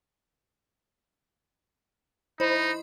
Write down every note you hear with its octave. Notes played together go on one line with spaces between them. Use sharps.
D#4 E4 C5 D#5 B5